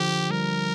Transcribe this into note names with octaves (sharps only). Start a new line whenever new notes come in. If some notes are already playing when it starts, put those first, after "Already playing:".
Already playing: D3 F3 G4
G3 A#4